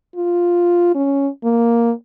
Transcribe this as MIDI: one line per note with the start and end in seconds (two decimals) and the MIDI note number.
0.16 0.95 65
0.95 1.28 61
1.44 1.91 58